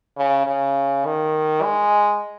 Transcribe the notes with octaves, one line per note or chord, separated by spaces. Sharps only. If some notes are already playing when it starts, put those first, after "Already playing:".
C#3
C#3
D#3
G#3